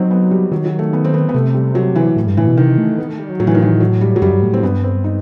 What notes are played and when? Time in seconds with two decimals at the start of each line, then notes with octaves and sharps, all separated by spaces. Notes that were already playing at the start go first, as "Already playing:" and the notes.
Already playing: F#3 C4 D#4
0.11 B3
0.31 G3
0.52 D#3 F#3
0.66 F#3
0.79 A3
0.93 B3
1.04 C4
1.14 B3
1.29 B3
1.34 C3 A3
1.54 G3
1.75 F#3
1.95 E3
2.16 A2
2.27 G2
2.37 A2 E3
2.47 B2
2.57 C3 D#3
2.78 A3
2.98 B3
3.09 A3
3.19 G3
3.30 F#3
3.40 A2 F#3
3.47 E3
3.54 D#3
3.62 E3
3.80 F#3
4.01 G3
4.16 F#3
4.22 F#2 G3
4.32 G2
4.42 A2
4.52 A2 C4
4.63 G2 B3
4.83 C4
5.04 D#4